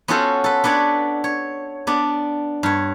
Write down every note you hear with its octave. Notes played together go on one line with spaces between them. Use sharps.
B3 C#4 F4 F#4 A4 C5
A4 B4
B3 D4 B4 C#5 D5
C#5
B3 D4 D5
G2 C#5